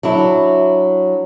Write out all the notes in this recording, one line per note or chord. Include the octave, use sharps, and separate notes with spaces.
F#3 D4 E4